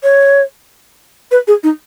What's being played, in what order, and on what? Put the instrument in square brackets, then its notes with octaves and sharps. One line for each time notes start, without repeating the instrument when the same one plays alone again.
[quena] C#5
B4
G#4
D#4